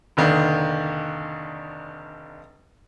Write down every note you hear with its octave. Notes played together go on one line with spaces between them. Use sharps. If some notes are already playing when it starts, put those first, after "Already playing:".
F1 D3 D#3 A#3 D4